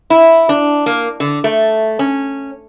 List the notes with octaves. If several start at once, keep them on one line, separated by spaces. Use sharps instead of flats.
E4
D4
A#3
D3
A3
C#4